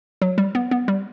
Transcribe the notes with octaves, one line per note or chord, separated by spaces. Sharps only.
F#3
G3
B3
B3
G3